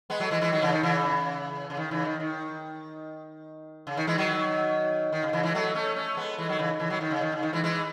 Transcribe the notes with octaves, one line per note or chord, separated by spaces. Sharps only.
G#3 B3
F#3 A3
E3 G#3
E3 G#3
D#3 F#3
C#3 E3
D#3
C#3 E3
C#3
D#3
C#3 E3
D#3
D#3
C#3
D#3
E3 G#3
D#3 F#3
D#3
C#3
C#3 E3
E3 G#3
F#3 A3
A3 C#4
A3 C#4
G#3 B3
E3 G#3
D#3 F#3
C#3 E3
C#3 E3
D#3 F#3
D#3
C#3
D#3
C#3
D#3
E3 G#3
E3 G#3